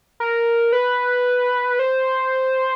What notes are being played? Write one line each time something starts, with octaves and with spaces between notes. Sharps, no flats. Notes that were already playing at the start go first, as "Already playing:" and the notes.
A#4
B4
C5